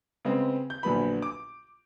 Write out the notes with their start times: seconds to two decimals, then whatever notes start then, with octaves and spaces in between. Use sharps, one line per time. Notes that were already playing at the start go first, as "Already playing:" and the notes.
0.25 C#3 G#3 B3 C4
0.70 G6
0.83 A#1 D3 F#3 B3 B5
1.22 D6